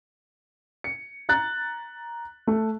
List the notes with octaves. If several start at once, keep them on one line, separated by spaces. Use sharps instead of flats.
C#7
A#5 F#6 A6
A3